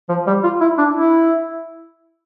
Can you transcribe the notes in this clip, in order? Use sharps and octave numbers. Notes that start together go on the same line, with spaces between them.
F3
G3
F4
E4
D4
E4